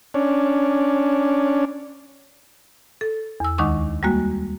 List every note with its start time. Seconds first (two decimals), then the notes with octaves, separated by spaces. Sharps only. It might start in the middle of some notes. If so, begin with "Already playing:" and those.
0.14 C#4 D4
3.01 A4
3.40 E2 E6
3.58 D2 D#3 G#3 D#4 C#6 D6
4.03 G3 G#3 A#3 F#4